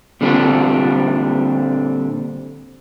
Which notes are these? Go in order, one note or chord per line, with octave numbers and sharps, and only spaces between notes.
A#2 D3 G3 B3 C4 D4